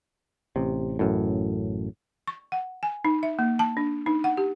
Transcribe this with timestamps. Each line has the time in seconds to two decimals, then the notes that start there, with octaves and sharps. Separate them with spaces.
0.56 A1 C3
0.99 A1 F#2 A2
2.27 C#6
2.52 F#5
2.83 G#5
3.05 D#4
3.23 E5
3.39 A#3
3.59 A5
3.77 D4
4.06 D#4
4.24 F#5
4.37 G4